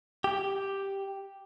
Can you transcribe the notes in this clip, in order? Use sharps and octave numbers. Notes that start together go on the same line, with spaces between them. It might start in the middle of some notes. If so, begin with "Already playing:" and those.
G4